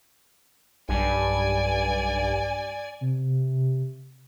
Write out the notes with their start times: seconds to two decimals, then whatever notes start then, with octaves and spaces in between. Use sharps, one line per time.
0.89 B1 G2 D5 G#5
3.01 C3